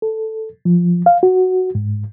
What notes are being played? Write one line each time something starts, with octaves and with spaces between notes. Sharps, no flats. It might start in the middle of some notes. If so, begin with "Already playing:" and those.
A4
F3
F5
F#4
G#2